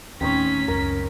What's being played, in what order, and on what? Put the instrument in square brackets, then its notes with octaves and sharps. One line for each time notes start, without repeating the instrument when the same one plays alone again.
[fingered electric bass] D#2 A2 [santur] C4 D#4 C#5 [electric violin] C#4 B6
[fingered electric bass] C#2 F#2 [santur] A#4